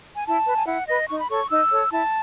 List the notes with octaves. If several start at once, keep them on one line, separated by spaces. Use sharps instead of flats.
G#5
E4 A5
B4
G#5
E4 F#5
B4 D#5
D#4 C#6
B5
A4 C#5 C#6
D#4 E6
A4 C#5
E4 A5